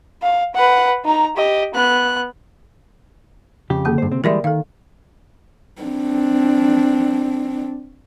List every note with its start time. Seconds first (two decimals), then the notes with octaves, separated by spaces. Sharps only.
0.22 F5
0.55 B4 F#5
1.05 D#4 A#5
1.37 G4 D#5
1.74 B3 F#6
3.70 F2 C#3 G4
3.85 D3 A#3 G#4
3.98 G2 C5
4.11 C3 C4
4.24 E3 G3 G#3 A#4 D5 E5
4.44 D#3 A4 F5
5.82 C4 D4